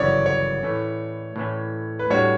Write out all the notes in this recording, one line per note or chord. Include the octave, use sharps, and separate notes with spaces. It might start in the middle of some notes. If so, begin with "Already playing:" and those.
Already playing: G1 F#2 C#3 E3 C#5 D5
C#5
A2 E3 A3 C#4
A2 E3 A3 C#4
B4
A2 G3 D4 F#4 C#5